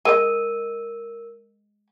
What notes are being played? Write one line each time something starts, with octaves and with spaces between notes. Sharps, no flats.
G#3 A#4 D#5 E6 D#7